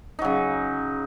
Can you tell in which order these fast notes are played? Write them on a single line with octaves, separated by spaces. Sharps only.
D#4 F#3 C#3